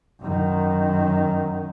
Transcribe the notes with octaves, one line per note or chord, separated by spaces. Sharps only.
F#2 D#3